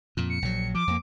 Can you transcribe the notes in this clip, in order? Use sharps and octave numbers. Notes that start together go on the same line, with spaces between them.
F2 A#2
C#7
A#1 F#3
F3 D6
F2 A#3